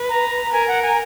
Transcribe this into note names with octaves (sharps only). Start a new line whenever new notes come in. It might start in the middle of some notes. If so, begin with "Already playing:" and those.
Already playing: B4
A#5
A#4 G#5
F#5
G#5